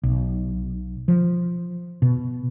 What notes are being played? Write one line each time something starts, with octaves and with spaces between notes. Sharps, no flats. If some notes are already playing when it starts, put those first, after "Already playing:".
B1
F3
B2